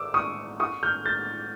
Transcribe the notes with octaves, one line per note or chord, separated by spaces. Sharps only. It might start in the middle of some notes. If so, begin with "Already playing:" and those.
Already playing: D6 E6
C#6 D#6
C#6 D#6
F6 G6
G6 A6